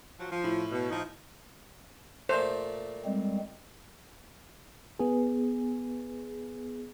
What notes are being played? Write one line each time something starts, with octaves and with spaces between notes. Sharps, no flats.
F3 F#3
F3
A2
B2
F3 D#4
A#2 A3 C5
G3 G#3 C4
B3 G#4